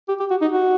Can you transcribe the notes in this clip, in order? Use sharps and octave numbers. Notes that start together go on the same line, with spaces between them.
G4
G4
F#4
D#4
F#4